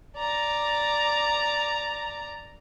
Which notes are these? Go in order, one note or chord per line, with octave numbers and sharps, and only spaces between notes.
D5 A#5